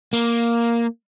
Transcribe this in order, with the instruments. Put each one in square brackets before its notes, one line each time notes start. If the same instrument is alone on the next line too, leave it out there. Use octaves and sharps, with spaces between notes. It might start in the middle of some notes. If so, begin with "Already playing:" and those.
[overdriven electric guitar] A#3